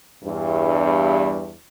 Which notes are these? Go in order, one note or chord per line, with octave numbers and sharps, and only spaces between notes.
E2 G2